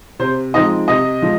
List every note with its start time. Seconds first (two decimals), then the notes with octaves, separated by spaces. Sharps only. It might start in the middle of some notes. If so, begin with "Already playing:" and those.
0.19 C3 C5
0.54 F3 G#3 C4 D#4 D#5
0.88 C3 D#5
1.22 F3 G#3